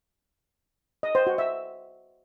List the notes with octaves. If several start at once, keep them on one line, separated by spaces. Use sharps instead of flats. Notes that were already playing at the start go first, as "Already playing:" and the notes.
D#5
C5
F#4
E5